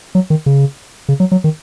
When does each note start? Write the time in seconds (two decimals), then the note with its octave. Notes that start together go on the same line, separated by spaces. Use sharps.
0.15 F#3
0.30 D#3
0.46 C#3
1.09 C#3
1.20 F#3
1.32 F#3
1.44 D#3